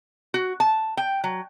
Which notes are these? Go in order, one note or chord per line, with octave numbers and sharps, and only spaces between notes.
F#4
A5
G5
F#3